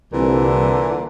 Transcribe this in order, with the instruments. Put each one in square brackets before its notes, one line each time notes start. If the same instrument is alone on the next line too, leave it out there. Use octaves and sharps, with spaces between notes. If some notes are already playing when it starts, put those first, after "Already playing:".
[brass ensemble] C2 [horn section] A#2 D3 E3